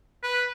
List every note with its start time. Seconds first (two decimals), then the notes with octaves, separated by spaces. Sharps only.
0.23 B4